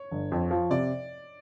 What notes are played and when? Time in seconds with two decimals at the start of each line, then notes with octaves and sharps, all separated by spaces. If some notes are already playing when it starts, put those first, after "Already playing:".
Already playing: C#5
0.11 G1
0.32 F2
0.51 F3
0.70 C3 D5